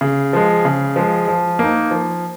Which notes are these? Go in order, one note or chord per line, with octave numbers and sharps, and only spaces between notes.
C#3
F3 G#3
C#3
F3 G#3
F3
A#3 D#4
F3